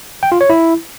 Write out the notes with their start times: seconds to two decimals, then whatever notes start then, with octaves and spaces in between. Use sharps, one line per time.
0.23 G5
0.32 F4
0.41 C#5
0.50 E4